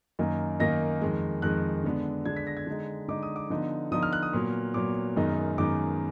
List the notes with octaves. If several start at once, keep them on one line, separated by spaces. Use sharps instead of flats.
F#2 D#3 A#3 D#4
F#2 D#3 A#3 D#4 A#6
F2 D#3 G#3
F2 D#3 G#3 F#6
D3 G#3 B3 D4
D3 G#3 B3 D4 G#6
B6
A#6
G#6
D3 G#3 D#4
D3 G#3 D#4 D6
D#6
D6
D3 F3 B3 D#4
D3 F3 B3 D#4 D#6
F6
F#6
D#6
A#2 F#3 B3
A#2 F#3 B3 D6
F#2 D#3 G#3 B3 D#4
F#2 D#3 G#3 B3 D#4 D6